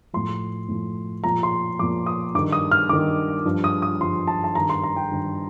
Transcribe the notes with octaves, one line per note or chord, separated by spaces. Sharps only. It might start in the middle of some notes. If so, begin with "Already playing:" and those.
A2 F3 C6
A2 F3
A#2 F3 A#5
C6
A#2 F3 D6
D#6
G2 D#3 D6
D#6
F6
G2 D#3 D6
G2 F3
D#6
D#6
G2 F3 C6
A5
A5
G2 D#3 A#5
C6
A#5
G5
G2 D#3